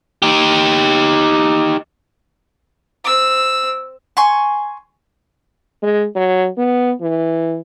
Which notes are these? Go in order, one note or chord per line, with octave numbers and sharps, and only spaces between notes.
D#4 G4
C4 E6
G#5 C6 C#6
G#3
F#3
B3
E3